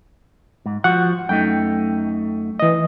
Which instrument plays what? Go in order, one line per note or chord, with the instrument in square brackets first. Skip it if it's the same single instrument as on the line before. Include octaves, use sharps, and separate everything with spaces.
[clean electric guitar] G#2
[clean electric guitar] F3 F#4 [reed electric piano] F#5
[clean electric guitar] F#2 A3 D#4 [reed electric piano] G5
[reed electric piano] E3 D#5